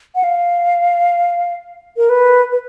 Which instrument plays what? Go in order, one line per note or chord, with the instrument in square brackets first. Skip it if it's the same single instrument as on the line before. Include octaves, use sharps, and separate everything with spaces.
[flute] F#5
F5
A#4
B4
B4